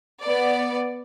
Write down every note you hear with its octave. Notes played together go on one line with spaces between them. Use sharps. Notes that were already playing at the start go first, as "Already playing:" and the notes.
B3 D5